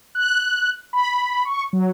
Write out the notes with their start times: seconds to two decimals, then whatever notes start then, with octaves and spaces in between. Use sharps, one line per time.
0.15 F#6
0.93 B5
1.45 C#6
1.73 F#3